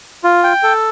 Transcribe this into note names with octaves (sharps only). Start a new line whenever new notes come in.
F4
G5
A4